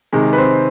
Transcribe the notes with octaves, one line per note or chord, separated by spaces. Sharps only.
C3 D#3 G#3
B4
C4 C5